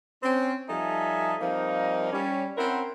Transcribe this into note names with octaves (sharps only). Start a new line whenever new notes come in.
C4 C#4
F3 G3 D#4 A4 E5 G#5
F3 G3 A#3 C4 D#4
G3 C#4
C4 C#4 E4 A#4 C5 F#5